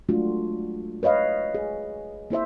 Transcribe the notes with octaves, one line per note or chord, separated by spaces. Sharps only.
F#3 G#3 A3 D4 F4 F#4
B4 C#5 D#5 F5
G#4
A#3 E4 C5 E5